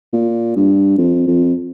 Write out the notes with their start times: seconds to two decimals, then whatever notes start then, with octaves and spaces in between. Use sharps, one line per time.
0.13 A#2
0.56 G2
0.98 F2
1.27 F2